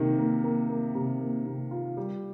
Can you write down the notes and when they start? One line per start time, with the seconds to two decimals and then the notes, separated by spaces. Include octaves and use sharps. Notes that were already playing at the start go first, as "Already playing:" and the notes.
Already playing: C3 D#3 A#3
0.19 A#3
0.44 A#3
0.69 A#3
0.95 C3
1.20 A#3
1.46 C3
1.71 F4
1.97 G3